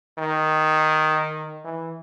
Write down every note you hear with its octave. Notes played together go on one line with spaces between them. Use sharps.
D#3
E3